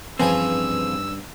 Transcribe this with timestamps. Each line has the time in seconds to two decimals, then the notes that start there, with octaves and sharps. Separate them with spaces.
0.20 G2 E3 F3 C4 C#4 G#4 E6